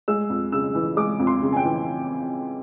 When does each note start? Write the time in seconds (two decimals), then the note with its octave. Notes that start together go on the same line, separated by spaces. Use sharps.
0.08 G#3 E6
0.30 F2
0.52 C#3 E6
0.75 E3
0.97 G#3 D6
1.19 F2
1.27 C6
1.42 C#3
1.53 G#5
1.57 G5
1.64 E3